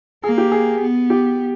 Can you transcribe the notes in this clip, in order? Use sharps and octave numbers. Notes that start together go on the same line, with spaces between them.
A#3 G#4
G4
G#4
B3
G4